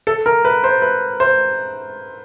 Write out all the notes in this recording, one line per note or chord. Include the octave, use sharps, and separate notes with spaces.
A4
A#4
B4
C5
B4
C5